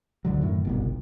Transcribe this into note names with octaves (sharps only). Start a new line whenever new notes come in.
D1 D3 F#3
F#2 A2 D#3
G1 C2 B2